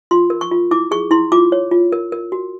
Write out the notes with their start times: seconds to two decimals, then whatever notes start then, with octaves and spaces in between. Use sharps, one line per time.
0.11 F4 C6
0.30 A#4
0.41 C#6
0.51 F4
0.71 E4 D6
0.91 G#4 C#6
1.11 E4 C6
1.32 F4 D6
1.52 C#5
1.71 F4
1.92 A#4
2.12 A#4
2.32 F#4